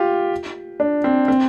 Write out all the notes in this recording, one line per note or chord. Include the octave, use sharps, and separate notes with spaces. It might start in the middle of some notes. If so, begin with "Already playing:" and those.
Already playing: F4 G4
D4
C4
C4